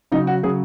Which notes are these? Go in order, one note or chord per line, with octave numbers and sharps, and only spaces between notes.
C#3 F#3 D#4
F#4
C#3 F#3 G#4